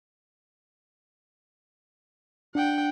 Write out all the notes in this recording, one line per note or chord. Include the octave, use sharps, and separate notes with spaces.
D4 F#5 G5